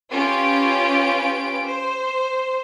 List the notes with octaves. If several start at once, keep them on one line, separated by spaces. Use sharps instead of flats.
C#4 F4 G4 B4 D7
C5